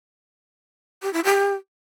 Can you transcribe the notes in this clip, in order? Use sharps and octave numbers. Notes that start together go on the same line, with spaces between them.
G4
E4
G4